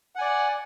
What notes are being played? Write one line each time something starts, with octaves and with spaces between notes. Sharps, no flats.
D5 F#5 G#5